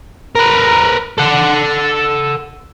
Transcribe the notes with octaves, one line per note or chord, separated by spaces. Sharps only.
A#4 B4
A4 F#5